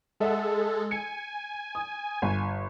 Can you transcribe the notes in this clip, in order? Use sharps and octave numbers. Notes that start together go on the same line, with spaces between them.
G#3 A4 E5 F#5
G#5 C#7
D#6
G1